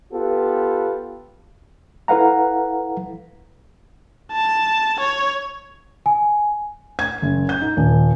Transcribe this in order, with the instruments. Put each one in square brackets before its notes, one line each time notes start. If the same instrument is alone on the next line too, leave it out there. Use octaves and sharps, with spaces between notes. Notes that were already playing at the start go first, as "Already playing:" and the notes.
[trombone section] B3 F4 G4 A4 B4
[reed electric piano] E4 A4 B4 F5 F#5 A#5
[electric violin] A5
C#5
[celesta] G#5
[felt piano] G#6
F#1
G6
D#4
D#1